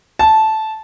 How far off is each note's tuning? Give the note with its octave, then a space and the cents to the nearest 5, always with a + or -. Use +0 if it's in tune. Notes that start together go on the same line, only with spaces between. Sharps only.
A5 -10